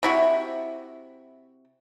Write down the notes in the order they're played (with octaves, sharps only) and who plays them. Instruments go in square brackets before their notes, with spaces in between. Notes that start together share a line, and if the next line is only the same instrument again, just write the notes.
[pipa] C3 E4 F#4